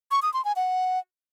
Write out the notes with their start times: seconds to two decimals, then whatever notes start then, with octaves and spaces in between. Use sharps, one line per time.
0.11 C#6
0.22 D#6
0.34 C6
0.45 G#5
0.56 F#5